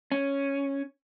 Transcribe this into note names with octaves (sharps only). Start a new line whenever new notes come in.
C#4